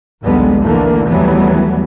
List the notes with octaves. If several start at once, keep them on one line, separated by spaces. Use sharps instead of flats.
A#1 D#2 D3 G3 G#3 B3
D3 E3 A3 A#3
D#2 E3 F#3 G3 A3 B3